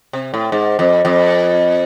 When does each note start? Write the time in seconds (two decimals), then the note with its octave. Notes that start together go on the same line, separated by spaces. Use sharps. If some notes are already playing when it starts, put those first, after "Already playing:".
0.13 C3
0.34 A2
0.52 G#2
0.79 F2
1.05 F2